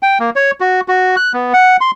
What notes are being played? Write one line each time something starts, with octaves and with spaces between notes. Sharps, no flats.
G5
A#3
C#5
F#4
F#4
F#6
B3
F#5
C6